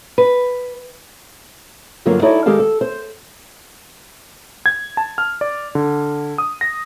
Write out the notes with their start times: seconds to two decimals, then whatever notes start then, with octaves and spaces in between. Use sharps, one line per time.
0.18 B4
2.06 G2 D3 F#3 A#3 F4
2.22 D#4 E4 F#4 A4 C#5 D5
2.46 D#3 G#3 G4 A4 F5 A5
2.59 A4
2.81 C5
4.66 G#6
4.97 A5
5.18 F6
5.41 D5
5.75 D3
6.38 D#6
6.61 A#6